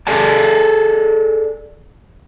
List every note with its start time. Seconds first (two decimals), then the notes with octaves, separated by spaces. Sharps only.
0.07 G#4 A4 D5 G#5 A5